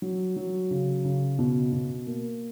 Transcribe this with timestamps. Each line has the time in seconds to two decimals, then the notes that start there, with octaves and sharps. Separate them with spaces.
0.02 F#3
0.36 F#3
0.71 C#3
1.04 C#3
1.39 B2
1.72 B2
2.07 A#3